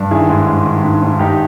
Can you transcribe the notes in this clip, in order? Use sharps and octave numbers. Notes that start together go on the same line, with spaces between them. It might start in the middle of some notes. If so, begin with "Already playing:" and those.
Already playing: G2
D#3 E4 G#4
G#2
G#2
D#3
G#2
G#2
G#2 D#4 G4